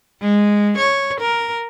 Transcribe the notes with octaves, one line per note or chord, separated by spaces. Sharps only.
G#3
C#5
A#4